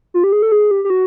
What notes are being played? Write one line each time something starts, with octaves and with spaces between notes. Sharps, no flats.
F4
G4
G#4
A4
G#4
G4
G4
F#4